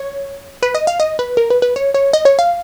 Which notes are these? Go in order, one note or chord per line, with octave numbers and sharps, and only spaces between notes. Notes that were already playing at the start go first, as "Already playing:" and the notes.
Already playing: C#5
B4
D#5
F5
D#5
B4
A#4
B4
B4
C#5
C#5
D#5
C#5
F5